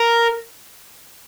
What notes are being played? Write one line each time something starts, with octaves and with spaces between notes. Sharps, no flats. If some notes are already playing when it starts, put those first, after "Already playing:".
Already playing: A#4